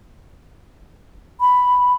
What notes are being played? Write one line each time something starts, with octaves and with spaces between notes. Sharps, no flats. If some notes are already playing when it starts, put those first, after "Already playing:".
B5